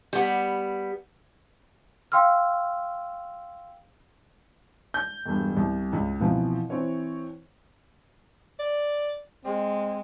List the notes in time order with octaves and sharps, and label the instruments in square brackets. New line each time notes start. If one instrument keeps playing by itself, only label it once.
[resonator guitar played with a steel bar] G3 B3
[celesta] F5 G5 C6 E6 F6
[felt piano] G6
E1 G2
C2
C#2
B2 E3 F3 C4
E3 C4 C#5
[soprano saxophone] D5
[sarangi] G#3 [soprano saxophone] C4